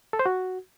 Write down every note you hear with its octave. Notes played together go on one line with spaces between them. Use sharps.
A4
C5
F#4